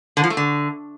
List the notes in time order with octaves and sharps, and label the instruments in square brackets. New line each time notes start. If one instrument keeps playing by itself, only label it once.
[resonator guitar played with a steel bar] D3
F3
A3
D3